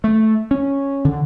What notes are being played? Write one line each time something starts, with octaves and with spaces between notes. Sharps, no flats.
A3
C#4
D3